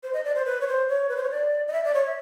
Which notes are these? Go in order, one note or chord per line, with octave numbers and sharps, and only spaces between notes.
C5
D#5
D5
C5
B4
C#5
C5
C#5
B4
C5
C#5
D5
D#5
E5
D5
C#5
E5